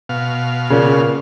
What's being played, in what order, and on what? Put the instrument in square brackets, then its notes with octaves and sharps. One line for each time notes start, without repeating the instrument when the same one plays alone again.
[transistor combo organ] B2 F5
[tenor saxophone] A#2 [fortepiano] C#3